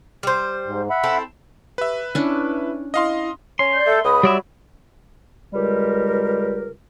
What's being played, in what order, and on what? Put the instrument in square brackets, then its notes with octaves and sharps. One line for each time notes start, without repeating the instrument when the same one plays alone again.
[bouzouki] G3 C5
[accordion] G#2
E5 F#5 B5
[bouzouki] C4 E4 A4
[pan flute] G4 [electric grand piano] B4 E5
[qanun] C#4 D4 [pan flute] E4
[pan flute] E4 [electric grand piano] D#5 F5 C6
[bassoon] C#4 [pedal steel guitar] C6
[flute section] D5 G6
[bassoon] A3 [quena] A4
[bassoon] C#2 [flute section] B5 [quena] D#6
[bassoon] F#3 [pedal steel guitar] G3 D5 E5
[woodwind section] C#2 G3 G#3 G4 A#4